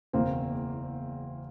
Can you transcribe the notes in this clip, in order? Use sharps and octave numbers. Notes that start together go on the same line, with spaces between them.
F#1 E2 B2 A#3 C4